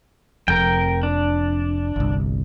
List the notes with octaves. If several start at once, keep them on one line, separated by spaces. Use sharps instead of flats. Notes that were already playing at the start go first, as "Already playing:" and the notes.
F1 F2 A#4 G5
D4
G1 C2